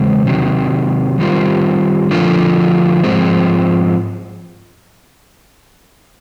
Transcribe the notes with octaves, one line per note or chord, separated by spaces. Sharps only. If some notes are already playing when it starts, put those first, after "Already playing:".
Already playing: E2 C#3 G#3 C4
C3 D#3 F#3
D#3 G3 C4 F4
D3 F3 A3 D4 F4
G#2 F3 G#3 C4